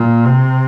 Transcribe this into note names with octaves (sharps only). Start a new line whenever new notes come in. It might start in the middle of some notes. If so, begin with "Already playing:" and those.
Already playing: A#2
C3